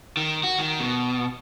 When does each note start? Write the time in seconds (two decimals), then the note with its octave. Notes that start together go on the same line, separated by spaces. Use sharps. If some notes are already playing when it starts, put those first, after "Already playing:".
0.17 D#3
0.44 F#4
0.59 D#3
0.80 B2